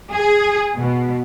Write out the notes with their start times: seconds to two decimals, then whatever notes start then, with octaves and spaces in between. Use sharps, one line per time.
0.11 G#4
0.75 B2